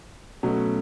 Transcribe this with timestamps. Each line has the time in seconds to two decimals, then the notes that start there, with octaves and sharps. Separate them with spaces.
0.43 B2 F#3 A3 C#4